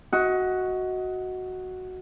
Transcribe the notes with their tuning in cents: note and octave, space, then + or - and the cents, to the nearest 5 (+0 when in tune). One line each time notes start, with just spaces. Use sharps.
F#4 +0 D#5 +25